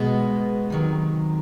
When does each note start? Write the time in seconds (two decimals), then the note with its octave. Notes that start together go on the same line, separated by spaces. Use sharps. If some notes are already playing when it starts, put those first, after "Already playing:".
Already playing: B2 G#3 B3
0.70 C3 D#3 F#3